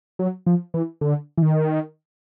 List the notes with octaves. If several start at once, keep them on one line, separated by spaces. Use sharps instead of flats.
F#3
F3
E3
D3
E3
D#3